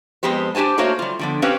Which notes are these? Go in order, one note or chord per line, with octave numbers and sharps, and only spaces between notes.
F2 G#3 B3 G4 C5
D4 G4 C5 G#5 A5
A3 A#3 F#4 C5 C#5 F5
G3 F4
D3 F3 B3
C4 C#4 G4 B4 C5 F5